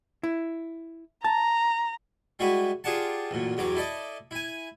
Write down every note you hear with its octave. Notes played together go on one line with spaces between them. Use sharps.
E4
A5 A#5
G3 G#3 E4 F#4 B4
F4 G4 G#4 D5 F#5 A5
A1 F#2 A#2
E2 G2 F#3 D6
E4 A4 D5 D#5
E4 G#5